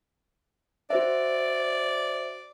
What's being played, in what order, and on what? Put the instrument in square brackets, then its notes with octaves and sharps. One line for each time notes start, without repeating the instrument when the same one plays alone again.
[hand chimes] F#4 C5 E5 [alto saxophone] D5